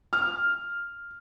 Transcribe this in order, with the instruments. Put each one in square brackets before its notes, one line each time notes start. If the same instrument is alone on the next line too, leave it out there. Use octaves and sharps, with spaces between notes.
[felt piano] F6